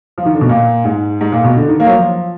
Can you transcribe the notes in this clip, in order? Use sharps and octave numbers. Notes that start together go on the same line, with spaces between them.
F3
D#3
D3
B2
A#2
G#2
G#2
A#2
B2
D3
D#3
A#3
F#3
F3